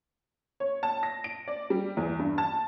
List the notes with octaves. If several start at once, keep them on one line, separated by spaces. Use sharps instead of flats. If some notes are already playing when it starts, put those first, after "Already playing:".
C#5
A5
A#6
D7
D5
G3
E2
G2
A5